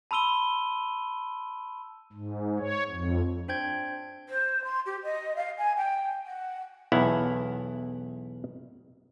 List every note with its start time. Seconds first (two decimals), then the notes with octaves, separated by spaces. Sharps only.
0.11 A5 B5 C6 E6 D#7 G7
2.13 G#2
2.59 C#5
2.89 F2
3.48 D4 C5 G5 G6 G#6
4.29 C5
4.64 C6
4.85 G4
5.03 D#5
5.36 F5
5.58 G#5
5.76 G5
6.26 F#5
6.92 B1 E2 E4 F5 F#5